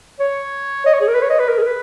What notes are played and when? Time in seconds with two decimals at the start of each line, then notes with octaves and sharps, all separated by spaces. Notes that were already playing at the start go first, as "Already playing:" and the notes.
0.20 C#5
0.86 D#5
0.94 C#5
1.01 G#4
1.08 A#4
1.15 B4
1.22 C#5
1.30 D#5
1.39 B4
1.49 A#4
1.58 G#4
1.62 A#4
1.67 B4